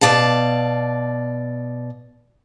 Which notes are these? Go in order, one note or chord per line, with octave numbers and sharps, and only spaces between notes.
B2 D5 F5 A5